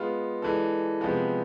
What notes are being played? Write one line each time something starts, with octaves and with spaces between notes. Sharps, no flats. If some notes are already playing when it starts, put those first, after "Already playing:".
Already playing: G#3 B3 F4
E3 G#3 D4 A4
C3 F3 G#3 B3